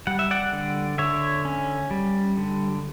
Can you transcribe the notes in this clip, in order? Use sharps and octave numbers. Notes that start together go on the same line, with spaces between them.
G3 F#5
E5
D5 F#5
D3
D3 C#5 E5
C#4
G3
D3